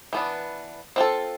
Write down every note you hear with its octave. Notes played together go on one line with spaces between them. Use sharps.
E3 B3 D4
C4 F4 A4